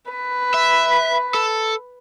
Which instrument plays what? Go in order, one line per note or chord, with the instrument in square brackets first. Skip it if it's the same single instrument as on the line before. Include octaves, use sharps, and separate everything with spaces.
[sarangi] B4
[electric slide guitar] E5
A4